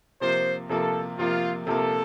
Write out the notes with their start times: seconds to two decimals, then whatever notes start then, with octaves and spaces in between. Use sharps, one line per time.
0.21 C3 F3 A#3 C5
0.69 C3 F3 A#3 A4
1.18 C3 F3 A#3 F4
1.67 C3 F3 A#3 A4